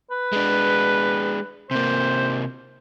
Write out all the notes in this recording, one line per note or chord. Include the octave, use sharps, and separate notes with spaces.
B4
G#3 D4
C3 A#3 C5